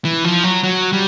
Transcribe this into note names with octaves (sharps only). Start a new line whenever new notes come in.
E3
F3
F#3
F#3
G3